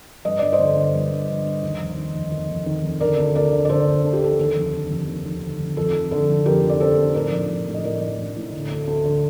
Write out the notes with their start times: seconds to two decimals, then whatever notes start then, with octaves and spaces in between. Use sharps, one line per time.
0.25 G2 D#5
0.39 G1 D5
0.53 C5 D#5
0.59 D3
0.76 G1
0.94 G2
1.11 G1
1.28 D3
1.45 G1
1.63 D#2
1.79 F1
1.97 D#3
2.15 F1
2.32 D#2
2.49 F1
2.66 D#3
2.84 F1
3.00 D3 A#4 D5
3.18 D2
3.35 D2 A#4 D5
3.53 D3
3.65 D5
3.69 D3 A4 C5
3.87 D2
4.04 D2 A4
4.13 G4
4.22 D3 A4
4.39 D#2 A4
4.56 F1
4.74 D3
4.90 F1
5.08 D#2
5.25 F1
5.42 D3
5.59 F1
5.77 F2 A4
5.94 F1
6.11 D3 A4
6.29 F1
6.46 F2 G4 A#4
6.64 F1
6.69 D5
6.80 D3 A4 C5
6.97 F1
7.14 A2 A#4 D5
7.32 A#1
7.50 A#1
7.67 A2
7.74 D#5
7.84 A2 A#4 D5
8.01 A#1
8.19 A#1
8.36 A2
8.53 D3
8.71 D2
8.87 D2
9.05 D3